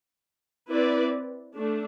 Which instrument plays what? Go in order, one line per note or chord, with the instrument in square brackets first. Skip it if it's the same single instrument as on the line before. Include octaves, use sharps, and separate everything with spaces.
[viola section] C4 E4 B4 D5
A3 D4